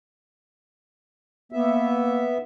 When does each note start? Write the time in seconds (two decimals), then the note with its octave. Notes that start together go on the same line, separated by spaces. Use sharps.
1.52 A#3 B3 E5